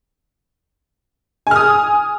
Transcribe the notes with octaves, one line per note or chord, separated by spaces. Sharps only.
G#5 D#6 F6